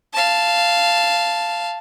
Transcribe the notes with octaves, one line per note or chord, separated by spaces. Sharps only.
F5 A5